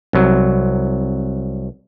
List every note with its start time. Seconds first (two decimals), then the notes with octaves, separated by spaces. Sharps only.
0.13 C2 F#3